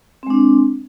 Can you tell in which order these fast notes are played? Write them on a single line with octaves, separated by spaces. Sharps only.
C4 G#3 D4